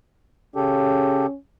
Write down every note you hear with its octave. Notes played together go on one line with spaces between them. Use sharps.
C#3 C#4 G4 A4